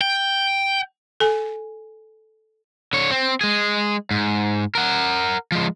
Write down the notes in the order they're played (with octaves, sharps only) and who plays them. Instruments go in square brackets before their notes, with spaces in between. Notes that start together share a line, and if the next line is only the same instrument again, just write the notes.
[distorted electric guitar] G5
[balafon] A4 G#5
[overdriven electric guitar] D3 C#5
C4
G#3 G#4
G#2
A#4 F#5
F3 G#3